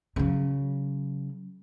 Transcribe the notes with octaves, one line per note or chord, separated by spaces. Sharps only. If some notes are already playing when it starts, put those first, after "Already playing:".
C#3 F#3